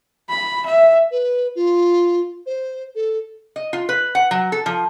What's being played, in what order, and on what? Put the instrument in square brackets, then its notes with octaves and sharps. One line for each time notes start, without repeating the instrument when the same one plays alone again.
[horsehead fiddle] B5
E5
[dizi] B4
F4
C5
A4
[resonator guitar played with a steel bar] D#5
F4
B4
F#5
F#3
A4
F3